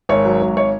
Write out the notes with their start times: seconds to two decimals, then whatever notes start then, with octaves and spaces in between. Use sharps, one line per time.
0.09 G#1 C#5
0.25 F#3
0.41 G#1
0.57 C#5